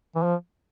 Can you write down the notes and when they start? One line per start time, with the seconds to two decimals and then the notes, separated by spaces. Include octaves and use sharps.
0.15 E3
0.23 F3